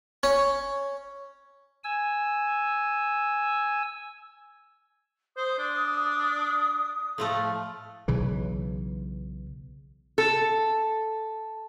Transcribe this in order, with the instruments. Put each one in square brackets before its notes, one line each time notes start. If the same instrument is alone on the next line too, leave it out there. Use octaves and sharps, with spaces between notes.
[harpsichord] C#4
[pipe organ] G#5 E6
[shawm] C5 [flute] D#6
[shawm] D4
[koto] A2 F3 A3
[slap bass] B1 C#3 E3
[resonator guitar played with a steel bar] A4